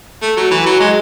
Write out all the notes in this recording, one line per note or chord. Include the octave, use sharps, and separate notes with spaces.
A3
F#3
E3
F#3
G#3